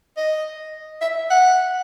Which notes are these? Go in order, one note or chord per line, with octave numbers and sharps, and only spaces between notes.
D#5
E5
F#5